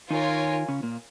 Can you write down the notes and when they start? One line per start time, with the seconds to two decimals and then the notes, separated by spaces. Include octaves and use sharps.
0.10 D#3 D#4 F4 A#4 C#5 G#5
0.69 C#3 C#4
0.83 A#2 A#3